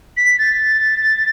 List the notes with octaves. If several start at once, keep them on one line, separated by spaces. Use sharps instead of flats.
B6
A6